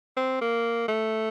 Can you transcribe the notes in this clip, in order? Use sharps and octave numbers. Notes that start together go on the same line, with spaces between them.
C4
A#3
A3